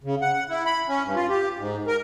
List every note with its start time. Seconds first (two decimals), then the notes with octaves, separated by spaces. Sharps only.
0.04 C#3
0.22 F#5
0.33 F#5
0.49 E4
0.66 B5
0.88 C#4
1.04 G2
1.16 F4
1.29 G4
1.58 G#2
1.87 A#4